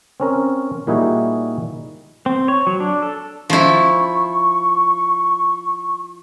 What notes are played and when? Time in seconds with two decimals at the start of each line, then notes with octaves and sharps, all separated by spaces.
0.20 C4 C#4 A#4
0.87 A#2 G3 D#4 E4 F#4 G#4
2.26 C4
2.48 C#5
2.67 F#3
2.80 D4
3.03 A4
3.50 F3 E4 C#6